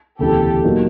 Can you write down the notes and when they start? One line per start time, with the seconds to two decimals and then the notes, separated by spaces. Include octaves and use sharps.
0.19 E1 D2 C#3 E3 G4 A4
0.64 A#2 F#3 A#3 D#4 F#4